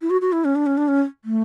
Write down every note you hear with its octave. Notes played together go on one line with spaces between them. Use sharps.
E4
F#4
F#4
E4
C#4
D4
C#4
D4
C#4
A3